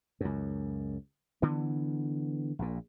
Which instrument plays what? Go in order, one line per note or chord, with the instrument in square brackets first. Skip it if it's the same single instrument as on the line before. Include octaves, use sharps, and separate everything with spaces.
[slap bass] C#2 F#2
D3 E3 B3
A#1 A#2